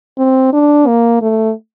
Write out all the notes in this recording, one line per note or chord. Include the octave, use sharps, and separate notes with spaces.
C4
D4
A#3
A3